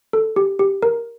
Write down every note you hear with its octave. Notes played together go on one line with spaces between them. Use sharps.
A4
G4
G4
A#4